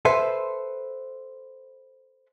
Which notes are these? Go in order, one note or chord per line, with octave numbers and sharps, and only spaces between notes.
A4 B4 C5 E5